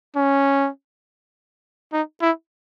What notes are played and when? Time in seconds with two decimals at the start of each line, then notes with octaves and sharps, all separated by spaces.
0.16 C#4
1.93 D#4
2.22 E4